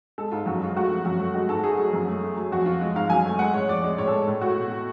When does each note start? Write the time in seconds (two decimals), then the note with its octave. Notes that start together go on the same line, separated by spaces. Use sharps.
0.18 G#3 A4
0.31 G#2 F4
0.46 F#2 F#4
0.62 G#3 F4
0.76 A3 F#4
0.91 F3
1.05 F#2 F#4
1.20 A3
1.34 G#3 F#4
1.49 G#2 A4
1.64 A3 G#4
1.78 F#3
1.93 F#2
2.07 A3
2.23 A3
2.36 F#3
2.51 F2 F#4
2.66 F3 F4
2.81 G#3
2.95 G#2 F5
3.10 F#2 G#5
3.25 A3
3.39 G#3 F#5
3.54 A2 C#5
3.68 F2 D5
3.84 G#3
3.98 A2 C#5
4.08 A4
4.13 G#3
4.27 A2
4.41 A3 F#4
4.57 B2
4.71 A3